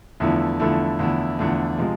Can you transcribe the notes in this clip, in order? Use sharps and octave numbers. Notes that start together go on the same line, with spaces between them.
E2 D3 F3 A3 E4
E2 D3 F3 A3 E4
E2 D3 F3 A3 E4
E2 D3 F3 A3 E4
C3 F3 G#3